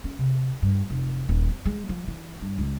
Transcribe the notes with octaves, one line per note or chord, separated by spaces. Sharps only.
C#4
C3
G2
F1
D#1
F2
G#3
F3
E3
G2
C#2